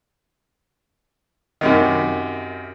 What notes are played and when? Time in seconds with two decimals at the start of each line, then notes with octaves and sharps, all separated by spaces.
1.61 F#2 C3 D#3